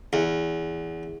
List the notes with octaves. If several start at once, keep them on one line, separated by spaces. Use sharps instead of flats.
E2